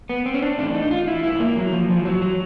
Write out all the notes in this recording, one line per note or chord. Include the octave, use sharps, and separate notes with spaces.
B3
C4
C#4
D4
A2 E3 D4
D#4
F4
E4
G#2 E3 E4
A#3
F#3
F3
G#2 E3 F3
F#3
F#3